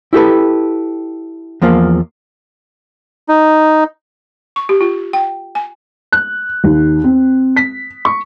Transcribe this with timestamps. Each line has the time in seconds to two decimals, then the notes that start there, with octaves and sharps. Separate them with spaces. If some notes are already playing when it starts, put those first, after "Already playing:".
0.13 E4 G4 A4 B4
1.62 E2 F3 A#3 F5
3.29 D#4
4.56 C#6
4.69 G4
4.81 F4
5.13 G5
5.55 G#5
6.12 F#6
6.64 D#2
7.04 C4
7.57 B6
8.05 C#6